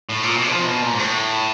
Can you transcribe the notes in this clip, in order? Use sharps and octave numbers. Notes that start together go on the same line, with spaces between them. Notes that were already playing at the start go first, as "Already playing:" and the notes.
A2
A#2
B2
F3
C3
B2
A#2
G#2
A2